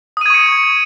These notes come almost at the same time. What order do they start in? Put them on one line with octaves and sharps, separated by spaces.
D#6 D#7 G#6 C#6 C#7